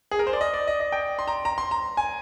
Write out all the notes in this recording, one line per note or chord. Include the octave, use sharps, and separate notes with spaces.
G#4
A#4
C5
D5
D#5
D5
D#5
D#5
G5
C6
A#5
A#5
C6
A#5
G#5